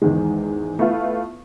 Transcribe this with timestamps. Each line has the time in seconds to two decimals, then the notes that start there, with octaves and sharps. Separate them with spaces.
0.02 E2 G#2 D#3 G#3
0.79 A3 B3 E4 F4